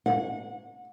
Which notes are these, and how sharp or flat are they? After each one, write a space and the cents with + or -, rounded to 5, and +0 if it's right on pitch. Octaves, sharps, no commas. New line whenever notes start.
F#5 -30